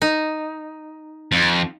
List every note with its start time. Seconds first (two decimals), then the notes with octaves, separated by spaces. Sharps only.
0.02 D#4
1.32 F2